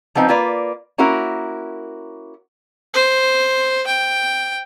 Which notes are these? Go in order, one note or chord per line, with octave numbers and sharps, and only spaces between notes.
F3 B3 C4 D#4
A#3 F4 B4 D5
A#3 C#4 E4 F#4 A#4
C5
G5